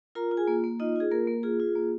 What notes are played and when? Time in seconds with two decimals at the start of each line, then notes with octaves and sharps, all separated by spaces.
0.15 F4 A#4 A#5
0.31 F4
0.37 G#4 G#5
0.47 A#3
0.64 A#3
0.80 D#4 F4 D#5
0.96 F4 G#4
1.11 A#3 A#4
1.27 A#3
1.43 F4 G#4
1.60 F4
1.75 A#3